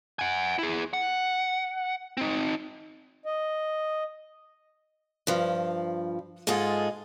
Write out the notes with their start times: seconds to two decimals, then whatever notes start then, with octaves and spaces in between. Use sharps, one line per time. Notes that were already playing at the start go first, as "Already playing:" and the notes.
0.19 F#5 G#5
0.59 E4 G#4
0.94 F#5
2.17 C4 D#4
3.25 D#5
5.27 G2 F3
6.47 G#2 G#3 F4 G#4 A4